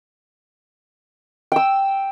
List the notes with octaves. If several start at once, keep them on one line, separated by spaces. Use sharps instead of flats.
G5 E6